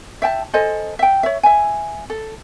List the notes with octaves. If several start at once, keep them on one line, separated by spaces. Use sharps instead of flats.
E5 G5 A5
A4 C5 D#5 G#5
E5 G5
C#5 E5
E5 G#5
A4